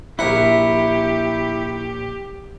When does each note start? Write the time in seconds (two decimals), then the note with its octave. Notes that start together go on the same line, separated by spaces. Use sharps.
0.19 A#1 E4 G4 A#4 F#5